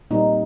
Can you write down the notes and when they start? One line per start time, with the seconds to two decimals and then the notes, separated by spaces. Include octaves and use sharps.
0.11 A#2 G3 C4 D#4